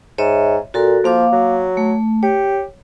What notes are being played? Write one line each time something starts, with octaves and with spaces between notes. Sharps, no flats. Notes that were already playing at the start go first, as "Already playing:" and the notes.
G#2 C#5 D#5 E5
A#2 F#4 A4 A#4
F3 A#3 F5 D6
F#3
A3
G4 C#5